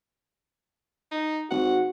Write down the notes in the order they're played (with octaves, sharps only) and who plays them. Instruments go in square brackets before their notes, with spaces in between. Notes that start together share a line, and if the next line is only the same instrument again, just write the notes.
[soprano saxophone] D#4
[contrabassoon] G#1 [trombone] F#4 [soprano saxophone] F#5